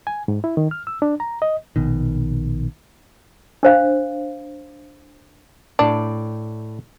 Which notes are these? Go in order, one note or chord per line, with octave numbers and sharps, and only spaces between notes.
G#5
G#2
E4
D#3
F6
E6
D4
A#5
D#5
A#1 B2 D#3
D4 C5 F5
A2 D4 D5